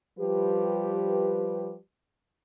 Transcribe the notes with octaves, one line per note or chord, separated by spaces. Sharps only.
F3 G3 G4 B4